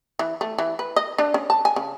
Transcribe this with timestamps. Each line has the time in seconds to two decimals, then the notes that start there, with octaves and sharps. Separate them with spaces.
0.19 E3
0.41 A3
0.58 E3
0.79 B4
0.96 D#5
1.18 D4
1.34 C#4
1.50 A5
1.65 G#5
1.76 C#3